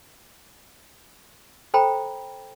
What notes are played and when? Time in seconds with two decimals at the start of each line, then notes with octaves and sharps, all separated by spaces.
1.74 A4 C5 G5 A#5 B5